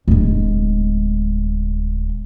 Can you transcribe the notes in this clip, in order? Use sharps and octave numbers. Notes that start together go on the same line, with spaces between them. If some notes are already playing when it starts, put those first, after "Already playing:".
D1 G#3